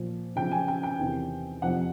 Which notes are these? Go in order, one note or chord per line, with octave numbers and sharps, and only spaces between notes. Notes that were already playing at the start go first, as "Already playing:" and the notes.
Already playing: A#2 F3
F#2 C#3 F3 G5
G#5
G5
G5
E2 C3 D#3
F2 C3 F3 F#5